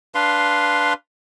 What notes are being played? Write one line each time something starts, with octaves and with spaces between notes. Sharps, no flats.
D4 B4 F5 C6